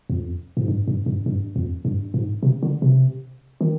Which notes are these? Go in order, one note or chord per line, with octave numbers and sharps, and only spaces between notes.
F2
G#2
G2
G2
G2
G2
F2
G2
G#2
C3
D3
C3
D#3